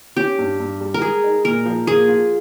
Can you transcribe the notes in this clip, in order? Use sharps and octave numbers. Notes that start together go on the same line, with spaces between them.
C#4 G4
G2
G2
G3
A#4
G#3 G#4
D#4
A#2 A#4
F3
A#3 G#4
F4